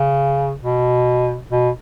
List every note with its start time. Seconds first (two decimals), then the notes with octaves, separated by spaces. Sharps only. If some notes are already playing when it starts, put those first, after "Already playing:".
Already playing: C#3
0.63 B2
1.50 B2